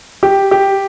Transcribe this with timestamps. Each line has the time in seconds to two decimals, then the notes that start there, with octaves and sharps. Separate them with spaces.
0.23 G4
0.51 G4